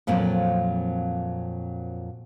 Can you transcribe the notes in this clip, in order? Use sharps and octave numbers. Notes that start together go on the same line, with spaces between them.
F2 A#2 F#3 A#3 C4